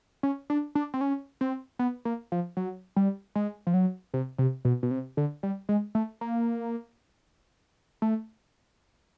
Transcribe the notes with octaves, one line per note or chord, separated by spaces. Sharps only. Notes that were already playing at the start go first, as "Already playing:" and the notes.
C#4
D4
D4
C4
C#4
C4
B3
A#3
F3
F#3
G3
G#3
F3
F#3
C3
C3
B2
B2
C3
D3
G3
G#3
A3
A#3
A3